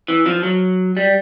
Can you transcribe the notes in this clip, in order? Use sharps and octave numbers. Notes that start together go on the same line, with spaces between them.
E3
F3
F#3
G3